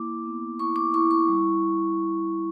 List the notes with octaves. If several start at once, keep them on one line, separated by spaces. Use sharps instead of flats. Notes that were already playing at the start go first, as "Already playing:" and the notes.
Already playing: A#3 E4 D6
B3
E4 C#6
D6
E4 C#6
C#6
G3